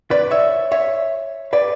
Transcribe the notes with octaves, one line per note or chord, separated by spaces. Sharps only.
B4 D5
C#5 E5
C#5 E5
B4 D5